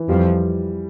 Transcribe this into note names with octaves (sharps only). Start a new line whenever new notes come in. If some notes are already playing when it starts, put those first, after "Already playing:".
Already playing: E3
F2 F3 G3